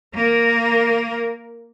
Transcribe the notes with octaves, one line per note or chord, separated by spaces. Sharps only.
A#3 A#4